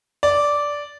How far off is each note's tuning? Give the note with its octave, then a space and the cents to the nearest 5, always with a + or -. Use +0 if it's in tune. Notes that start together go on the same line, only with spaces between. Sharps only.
D5 -10